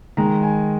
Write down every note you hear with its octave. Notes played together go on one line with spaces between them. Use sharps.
D#3 G#3 A#5
G#5